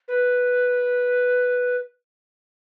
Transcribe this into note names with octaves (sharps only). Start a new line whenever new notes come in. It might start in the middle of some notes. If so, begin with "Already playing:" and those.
B4